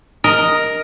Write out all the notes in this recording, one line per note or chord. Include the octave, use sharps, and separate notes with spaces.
A#4 D#5